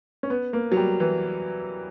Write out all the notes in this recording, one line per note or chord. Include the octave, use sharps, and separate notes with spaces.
C#4
B3
A#3
F#3
G3
E3